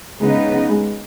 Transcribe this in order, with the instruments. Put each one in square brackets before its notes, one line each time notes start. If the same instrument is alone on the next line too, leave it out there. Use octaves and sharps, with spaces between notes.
[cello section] C#3 B3 D#4 [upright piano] G#3
[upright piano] G#3